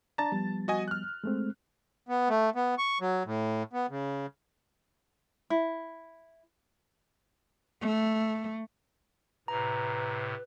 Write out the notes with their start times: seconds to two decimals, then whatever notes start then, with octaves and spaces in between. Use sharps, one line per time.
0.18 D4 D5 A5 A#5 A6
0.32 F3 G3 B3
0.68 F#4 D#5 G#5
0.88 F6 F#6
1.24 G#3 A3 C4
2.09 B3
2.29 A3
2.56 B3
2.78 C#6
3.01 F#3
3.26 A2
3.73 B3
3.90 C#3
5.50 E4
7.82 A3
9.48 A2 C3 B4 A#5